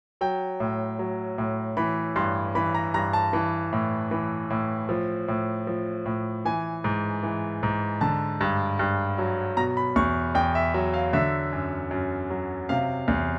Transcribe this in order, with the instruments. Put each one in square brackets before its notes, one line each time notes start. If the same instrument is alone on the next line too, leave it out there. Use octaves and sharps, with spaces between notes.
[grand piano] F#3 G5
A2
F#3
A2
E3 B5
G2 C6
E3 B5
A#5
G2 A#5
A5
E3
A2
E3
A2
F3
A2
F3
A2
E3 G#5
G#2
E3
G#2
D3 A5
G2
G2
F#3
B2 A#5
B5
E2 C#6
E2 G5
E5
F#3 E5
F5
D3 E5
F#2
F#2
F#3
C3 F5
E2